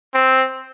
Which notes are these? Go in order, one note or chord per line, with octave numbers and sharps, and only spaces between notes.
C4